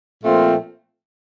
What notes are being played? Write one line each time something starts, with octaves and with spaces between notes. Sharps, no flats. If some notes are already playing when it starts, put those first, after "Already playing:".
A#2 F3 A3 C4 F4